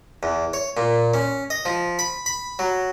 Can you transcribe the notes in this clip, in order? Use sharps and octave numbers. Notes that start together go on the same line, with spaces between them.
E2
C#5
A#2
C#4
D#5
F3
B5
B5
F#3